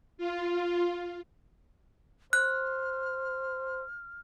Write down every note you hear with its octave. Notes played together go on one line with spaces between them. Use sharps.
F4
C5 F6 F#6